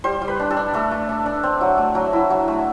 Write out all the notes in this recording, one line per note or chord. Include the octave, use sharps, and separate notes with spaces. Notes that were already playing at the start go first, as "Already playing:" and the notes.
G3 C5
G3
B4
D4
A4
D4
A3 A4
A3
D4
D4
C4
F#3
A3
F#3
E4
F#3
A3